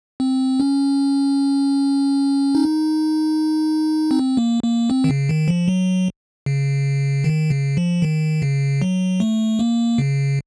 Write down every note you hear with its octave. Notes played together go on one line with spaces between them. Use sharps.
C4
C#4
D#4
C4
A#3
A#3
C4
D#3
C#3
D#3
F3
F#3
C#3
D#3
C#3
F3
D#3
C#3
F#3
A3
A#3
C#3